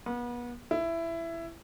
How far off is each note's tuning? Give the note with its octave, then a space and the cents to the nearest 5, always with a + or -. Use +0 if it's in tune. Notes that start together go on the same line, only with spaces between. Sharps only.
B3 -35
E4 +15